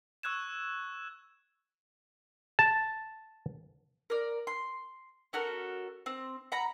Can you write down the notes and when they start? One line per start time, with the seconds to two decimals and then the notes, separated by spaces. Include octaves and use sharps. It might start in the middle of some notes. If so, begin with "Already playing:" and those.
0.23 C#6 E6 F#6 G#6 E7
2.59 A5
4.10 A#4 D5
4.47 C6
5.33 C#4 F#4 A4 A#4
6.06 C4
6.52 F#5 A#5 B5